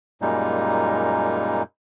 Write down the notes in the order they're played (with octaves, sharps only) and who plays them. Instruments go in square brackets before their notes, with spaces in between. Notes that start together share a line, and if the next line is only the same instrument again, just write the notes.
[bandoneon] F#2 A#2 G3 G#3 A#3 D#4